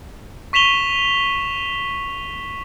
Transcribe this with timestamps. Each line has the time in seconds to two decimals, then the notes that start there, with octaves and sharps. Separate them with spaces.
0.53 C#6 B6 E7 F7 G7